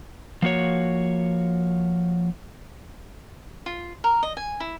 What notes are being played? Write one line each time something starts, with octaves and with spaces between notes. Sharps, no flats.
F3 A#3 F#4 C#5
F4
A#4
D#5
G#5
E4